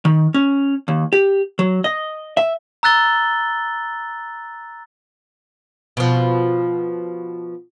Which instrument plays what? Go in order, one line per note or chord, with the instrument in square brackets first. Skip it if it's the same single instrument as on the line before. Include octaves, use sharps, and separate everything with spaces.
[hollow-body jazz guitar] D#3
C#4
D#2
G4
F#3
D#5
E5
[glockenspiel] A#5 E6 F#6 A6 G7
[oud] B2 F3